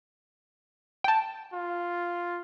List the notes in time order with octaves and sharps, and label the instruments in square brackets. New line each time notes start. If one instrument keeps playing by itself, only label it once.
[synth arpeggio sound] G5 A5
[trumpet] F4